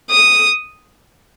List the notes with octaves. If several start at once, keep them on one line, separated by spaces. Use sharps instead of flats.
D#6